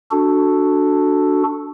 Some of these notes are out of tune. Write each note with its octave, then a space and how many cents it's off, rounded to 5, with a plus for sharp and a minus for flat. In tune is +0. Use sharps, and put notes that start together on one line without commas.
D4 +0 F#4 +0 A4 +0